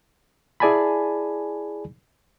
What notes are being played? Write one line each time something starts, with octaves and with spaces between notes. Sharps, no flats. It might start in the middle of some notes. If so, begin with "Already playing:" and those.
E4 G#4 D5 G#5 A5 B5